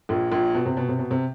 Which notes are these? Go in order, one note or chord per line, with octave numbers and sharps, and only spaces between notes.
A#1 A#2
A#1 A#2
B2
C3
B2
C3
B2
C3